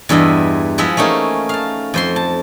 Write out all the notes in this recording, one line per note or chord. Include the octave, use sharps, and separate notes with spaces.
E2 G2 E4 D#5 E5
F3 G#3 E4 D#5 E5 F#5
A3 A#3 C#4 D#4 G#4
F5 A5
F2 C5 C6
A5